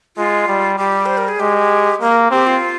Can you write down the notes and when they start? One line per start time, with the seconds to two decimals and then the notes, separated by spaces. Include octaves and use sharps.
0.17 G#3 F4
0.48 G3
0.78 G3 G4
1.06 C5
1.18 A#4
1.28 G#4
1.40 G#3 G4
2.01 A#3 A#4
2.31 C4 G4
2.47 F4